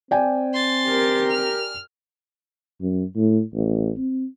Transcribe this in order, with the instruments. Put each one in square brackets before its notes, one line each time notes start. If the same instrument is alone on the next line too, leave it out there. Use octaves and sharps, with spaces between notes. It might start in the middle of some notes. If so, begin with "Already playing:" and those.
[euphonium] C4 [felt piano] D5 G5 G#5
[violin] C6 A6
[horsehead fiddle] G4 A#4
[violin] F6
[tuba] F#2
A2
A1
C4